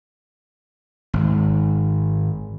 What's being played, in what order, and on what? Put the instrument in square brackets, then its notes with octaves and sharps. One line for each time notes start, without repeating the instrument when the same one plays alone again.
[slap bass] G#1